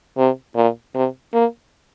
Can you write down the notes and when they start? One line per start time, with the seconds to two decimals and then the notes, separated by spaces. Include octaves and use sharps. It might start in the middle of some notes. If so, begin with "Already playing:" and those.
0.17 C3
0.55 A#2
0.94 C3
1.33 A#3